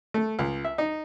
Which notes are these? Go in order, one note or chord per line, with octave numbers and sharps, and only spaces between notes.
A3
C#2
E5
D#4